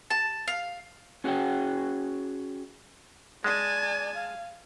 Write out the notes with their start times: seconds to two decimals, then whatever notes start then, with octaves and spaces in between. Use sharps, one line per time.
0.10 A5
0.48 F5
1.24 C#4 F#4 G#4 C#5 G5
3.44 G#3 D5 G#5 A5
4.14 F5